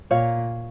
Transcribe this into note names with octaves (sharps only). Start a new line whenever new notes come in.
A#2 C#5 F5